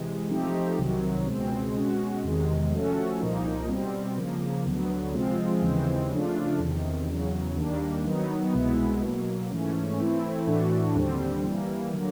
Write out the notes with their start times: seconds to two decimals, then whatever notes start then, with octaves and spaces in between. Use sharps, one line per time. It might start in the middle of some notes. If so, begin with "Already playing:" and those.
Already playing: C3 E3 G#3
0.30 F3 A3 C4 D#4 G4
0.78 C2 C3 D#3 F#3
1.26 C#2 B2 G#3 C4
1.76 B2 G#3 C#4 F#4
2.24 E2 C3 D#3 G#3
2.72 F3 A3 C#4 F#4 A4
3.20 C2 A#2 F3 A#3 D#4
3.69 B2 G3 C4
4.17 C#3 F3 A#3
4.65 D2 D3 F#3 B3
5.13 C3 F3 G#3 C4 F4
5.62 D#2 C#3 E3 G#3 C4
6.11 C#3 F3 A3 D4 F4
6.59 E2 C3 D#3
7.08 E2 C#3 F#3
7.56 D#2 D#3 G3 A#3 D4
8.05 D#3 F#3 B3 D#4
8.53 C2 B2 G#3 B3 E4
9.02 B2 F#3 A#3
9.50 G#2 E3 A3 C#4
9.99 E3 A3 C4 E4
10.47 A2 E3 A3 D4 F#4
10.95 D#2 D3 G3 C4
11.44 E3 G3 A#3
11.93 D3 F#3 A#3